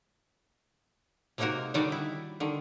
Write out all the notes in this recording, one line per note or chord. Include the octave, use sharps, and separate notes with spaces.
C3 G#3 A#3 D#4 F#4 A#4
D3 D#3 G3 D#4 F#4 D5
E4
D3 D#3